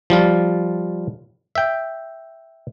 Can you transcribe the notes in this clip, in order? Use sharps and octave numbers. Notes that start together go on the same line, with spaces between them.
F3 G3 F4
E5 G5